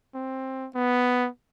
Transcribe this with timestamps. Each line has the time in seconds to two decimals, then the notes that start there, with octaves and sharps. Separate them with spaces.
0.15 C4
0.75 B3